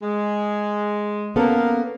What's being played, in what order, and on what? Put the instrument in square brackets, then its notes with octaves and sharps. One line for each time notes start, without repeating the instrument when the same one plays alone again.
[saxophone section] G#3
[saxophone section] A#3 [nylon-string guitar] B3 C#4 A4